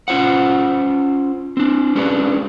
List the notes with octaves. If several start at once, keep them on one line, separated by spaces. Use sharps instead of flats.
C#4 F4 C5 F#5
C4 D4
G#3 C#4 D4 G4 B4